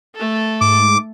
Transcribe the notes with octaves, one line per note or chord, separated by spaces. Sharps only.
A3 A4
G#2 D6